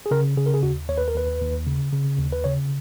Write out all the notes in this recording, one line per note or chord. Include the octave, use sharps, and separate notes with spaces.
G#4
C#3 A#4
C#3 G#4
A#4
G#4
D#2 F#4
D#2 C#5
B4
A#4
D#2 B4
D#2
C#3
C#3
D#2
B4
C#3 C#5